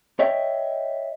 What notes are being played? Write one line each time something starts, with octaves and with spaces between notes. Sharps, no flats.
C#5 D#5 E5 G5